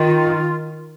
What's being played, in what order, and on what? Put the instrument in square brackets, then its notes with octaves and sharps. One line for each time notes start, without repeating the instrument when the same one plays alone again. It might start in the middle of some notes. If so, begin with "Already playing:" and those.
Already playing: [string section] D#3 [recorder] F4